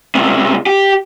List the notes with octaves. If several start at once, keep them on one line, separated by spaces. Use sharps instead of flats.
C#2 C3
G4